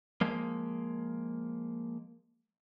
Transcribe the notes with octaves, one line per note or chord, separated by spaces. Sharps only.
F3 G#3 A#3